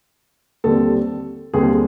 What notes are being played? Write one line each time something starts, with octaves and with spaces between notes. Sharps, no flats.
D#2 D3 G3 C4 A4
D#2 D3 G3 C4 G#4